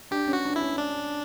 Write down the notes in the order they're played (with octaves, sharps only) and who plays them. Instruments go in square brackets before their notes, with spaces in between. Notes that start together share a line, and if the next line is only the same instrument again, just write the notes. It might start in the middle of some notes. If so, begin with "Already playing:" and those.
[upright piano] D4 [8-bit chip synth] G4
[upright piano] C#4
[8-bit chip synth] F#4
[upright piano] D4
[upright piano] C#4 [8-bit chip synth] E4
[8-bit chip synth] D4